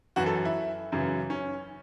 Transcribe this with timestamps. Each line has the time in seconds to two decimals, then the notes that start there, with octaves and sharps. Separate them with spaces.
0.16 F#2 E3 F#4
0.26 A4
0.45 E4
0.92 F#2 C#3 E3
1.30 C#4